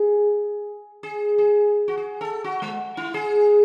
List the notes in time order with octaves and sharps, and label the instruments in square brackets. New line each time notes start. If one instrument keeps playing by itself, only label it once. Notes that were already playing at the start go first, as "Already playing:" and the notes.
Already playing: [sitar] G#4
G#4
G#4
F#4
G#4
A4
F#4
G#3
E4
G#4